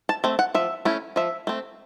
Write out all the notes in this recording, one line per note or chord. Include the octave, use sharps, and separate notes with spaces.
A5
A3 C4
F#5
F3 E5
A3 C#4 E4
F3 E5
A3 C4